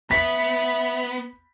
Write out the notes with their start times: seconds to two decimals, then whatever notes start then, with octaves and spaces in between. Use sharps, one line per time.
0.11 B3 E5 B5 B6